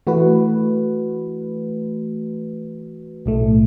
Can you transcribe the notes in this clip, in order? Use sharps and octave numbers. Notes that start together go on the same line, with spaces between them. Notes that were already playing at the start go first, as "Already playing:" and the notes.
E3 A3 F#4 B4
B1 A2 A3